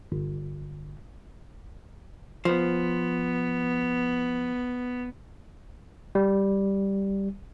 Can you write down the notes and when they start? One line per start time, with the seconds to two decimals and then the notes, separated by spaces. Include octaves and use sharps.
0.12 G1
2.45 F3 B3
6.15 G3